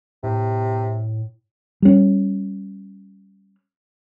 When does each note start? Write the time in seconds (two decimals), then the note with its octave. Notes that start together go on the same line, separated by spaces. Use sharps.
0.24 A2 C3
1.82 G3 C#4